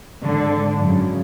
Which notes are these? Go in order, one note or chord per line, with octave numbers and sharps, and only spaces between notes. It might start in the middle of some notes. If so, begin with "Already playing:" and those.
G#2 D3
F#2 C#3